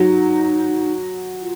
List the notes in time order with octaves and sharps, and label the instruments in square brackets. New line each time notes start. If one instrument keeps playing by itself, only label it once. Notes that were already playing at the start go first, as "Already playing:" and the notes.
Already playing: [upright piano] F#3 [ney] D#4
[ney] F4